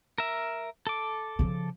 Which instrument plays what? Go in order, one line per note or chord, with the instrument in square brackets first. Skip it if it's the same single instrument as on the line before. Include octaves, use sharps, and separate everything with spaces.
[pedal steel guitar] A#4 E5
A4 D6
[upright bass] C#3 F3